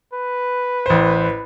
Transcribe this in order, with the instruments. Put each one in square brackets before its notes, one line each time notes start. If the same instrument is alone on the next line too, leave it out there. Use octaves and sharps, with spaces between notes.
[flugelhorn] B4
[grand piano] A1 C5